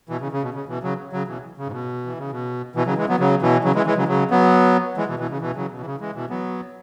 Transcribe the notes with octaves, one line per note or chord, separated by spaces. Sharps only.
B2 E3
C#3
C#3
B2
C#3
B2 E3
C#3 F#3
C#3 F#3
B2 E3
C#3
G#2
B2
E3
C#3
B2
B2 E3
C#3 F#3
E3 G#3
F#3 B3
C#3 F#3
B2 E3
C#3 F#3
E3 G#3
E3 G#3
C#3 F#3
C#3 F#3
F#3 B3
E3 G#3
B2 E3
B2 E3
C#3
B2 E3
C#3 F#3
B2
E3
C#3
E3 G#3
B2 E3
F#3 B3